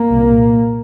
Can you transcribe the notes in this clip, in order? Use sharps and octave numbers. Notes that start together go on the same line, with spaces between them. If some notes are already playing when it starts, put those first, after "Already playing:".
Already playing: A#3
C2 A#2